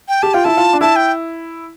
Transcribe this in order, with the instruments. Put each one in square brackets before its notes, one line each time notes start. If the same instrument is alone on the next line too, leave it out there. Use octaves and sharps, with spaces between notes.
[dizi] G5
[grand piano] G4 [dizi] A5
[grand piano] F4 [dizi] G5
[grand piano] E4 [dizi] A5
[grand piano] F4
D4
[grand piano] E4 [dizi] A5
[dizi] G5